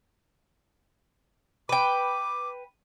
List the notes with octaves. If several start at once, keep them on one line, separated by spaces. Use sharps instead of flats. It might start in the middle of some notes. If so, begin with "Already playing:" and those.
B4 G5 D6